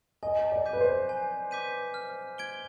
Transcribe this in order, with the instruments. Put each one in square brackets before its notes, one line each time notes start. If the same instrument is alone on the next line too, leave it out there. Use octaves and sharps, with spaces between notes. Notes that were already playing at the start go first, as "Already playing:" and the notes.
[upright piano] D#5 [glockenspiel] G#5
[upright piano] D5
[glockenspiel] D6 G6 B6 D#7
[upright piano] B4
C5
[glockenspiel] G#5
D6 G6 B6 D#7
F6
G#6 D7 G7